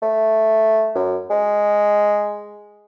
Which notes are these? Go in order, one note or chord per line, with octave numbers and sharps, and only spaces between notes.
A3
F#2
G#3